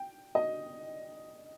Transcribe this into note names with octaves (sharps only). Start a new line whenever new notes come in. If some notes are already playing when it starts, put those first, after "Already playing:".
Already playing: G5
D#5